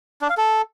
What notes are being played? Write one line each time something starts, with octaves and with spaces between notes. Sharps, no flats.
D4
F5
A4